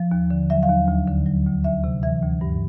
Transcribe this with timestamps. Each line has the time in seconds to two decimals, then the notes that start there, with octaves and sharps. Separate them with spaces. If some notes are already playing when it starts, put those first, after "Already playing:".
Already playing: F3
0.12 D#2
0.31 D3
0.50 F#3 E5
0.63 F5
0.69 D#2
0.88 D2
1.08 D3
1.26 F#3
1.46 D2
1.64 D2 E5
1.84 C3
2.03 E3 E5
2.22 D2
2.41 G2